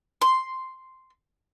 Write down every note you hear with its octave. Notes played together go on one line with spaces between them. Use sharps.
C6